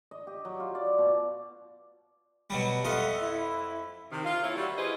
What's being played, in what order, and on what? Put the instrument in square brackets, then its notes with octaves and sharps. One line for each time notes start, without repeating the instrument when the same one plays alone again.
[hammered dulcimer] D#5
G4
F#3
F4
D5
B2
[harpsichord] B2 F#3 G3
[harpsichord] F2 F4 D#5 [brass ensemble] E5 F#5
[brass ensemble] E4
[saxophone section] C3 D#3
F4
E3 A#3 E4 A4 C#5
G3 F#4
E4 F4 G#4 B4 C5 D#5